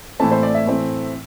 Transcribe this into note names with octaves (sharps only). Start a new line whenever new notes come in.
A2 E3 A3 C4 A5
C5
D5
E5
A2 E3 A3 C4